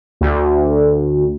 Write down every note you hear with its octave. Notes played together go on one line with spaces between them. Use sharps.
D2